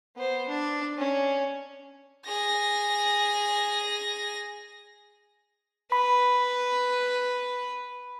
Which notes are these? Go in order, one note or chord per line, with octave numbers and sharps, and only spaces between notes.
B3 C5
D4
C#4
G#4 A#6
B4 B5